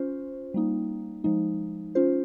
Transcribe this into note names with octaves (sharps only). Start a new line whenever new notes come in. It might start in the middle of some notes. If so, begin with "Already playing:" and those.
Already playing: C#4 F4 C5
G3 A#3 D#4
F3 G#3 D#4
C#4 F4 C5